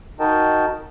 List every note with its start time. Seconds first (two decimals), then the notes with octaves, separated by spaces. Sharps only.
0.20 D#4 F#4 A#4 D#5 G5 A5